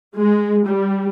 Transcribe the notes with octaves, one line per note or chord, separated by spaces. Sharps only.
G#3
G3